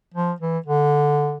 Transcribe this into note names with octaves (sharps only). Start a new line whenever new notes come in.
F3
E3
D3